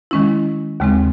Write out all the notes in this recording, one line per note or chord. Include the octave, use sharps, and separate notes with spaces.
D#3 G#3 C#4 E4
D#2 C#3 G#3 C4